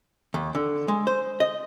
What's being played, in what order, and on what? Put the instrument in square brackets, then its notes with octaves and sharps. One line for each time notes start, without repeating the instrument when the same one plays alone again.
[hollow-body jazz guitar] D#2
D3
G#3
C5
D#5